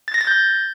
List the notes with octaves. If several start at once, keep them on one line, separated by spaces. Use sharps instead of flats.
A6
A#6
A6
G6